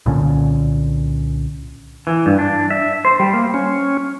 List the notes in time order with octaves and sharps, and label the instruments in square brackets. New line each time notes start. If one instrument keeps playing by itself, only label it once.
[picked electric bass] C2 A#2 D3 C#4
[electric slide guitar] E3
G2
D4
E5
C5
G3
A#3
[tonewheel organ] C#4